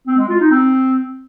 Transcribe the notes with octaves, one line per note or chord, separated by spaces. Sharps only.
C4
G#3
F4
D#4
C4